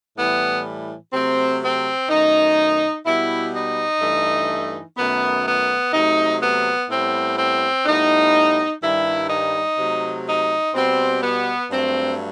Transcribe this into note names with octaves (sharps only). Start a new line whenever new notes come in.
A2 E3 G3 B3
C3 F#3 A3 C4
C4
F#2 D#3 A3 D#4
B2 G3 B3 E4
D#4
G2 E3 A3
F#2 D#3 A3 B3
B3
C3 F#3 A3 D#4
B3
A2 G3 B3 C4
C4
A2 G3 B3 D#4
G2 D#3 G3 E4
D#4
C3 F#3 A3
D#4
B2 G3 B3 C4
B3
G2 F#3 A3 C4